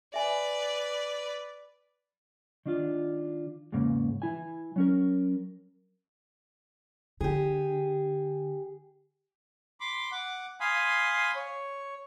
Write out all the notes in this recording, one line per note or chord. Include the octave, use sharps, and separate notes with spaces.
B4 D5 E5 G#5
D#3 D4 F4
E2 G#2 C#3 A#3
E3 E4 G#5
F#3 C#4 A#4
D3 G4 G#4
B5 C6 D6
F#5 D6
F5 G#5 B5 C6 D#6
C#5